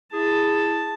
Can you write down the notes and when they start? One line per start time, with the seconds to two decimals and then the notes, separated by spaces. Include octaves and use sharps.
0.13 E4 G#4 A5